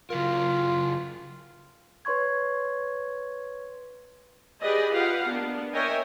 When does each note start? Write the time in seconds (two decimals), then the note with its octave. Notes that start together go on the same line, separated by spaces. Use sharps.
0.10 C#3 F#3 F4 A#4
2.05 B4 C#5 C6 C#6 G#6
4.62 G4 G#4 B4 D5 D#5
4.91 F4 G4 B4 F5 F#5
5.27 A#3 B3 D4
5.74 A#4 C#5 D#5 E5 G5 G#5